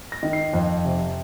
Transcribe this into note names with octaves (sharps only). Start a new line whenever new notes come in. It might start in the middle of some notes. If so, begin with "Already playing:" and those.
A#6
D#3
C7
F2
C3